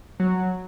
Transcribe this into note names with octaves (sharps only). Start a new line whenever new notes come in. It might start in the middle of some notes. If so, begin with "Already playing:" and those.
F#3